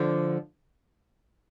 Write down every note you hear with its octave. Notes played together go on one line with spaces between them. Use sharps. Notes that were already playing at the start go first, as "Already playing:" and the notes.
Already playing: D3 F3